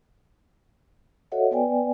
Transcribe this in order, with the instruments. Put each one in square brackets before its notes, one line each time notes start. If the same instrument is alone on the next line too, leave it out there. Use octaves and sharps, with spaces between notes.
[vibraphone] F#4 A4 C#5 D#5 E5 F#5
B3 B4 D5 G5 G#5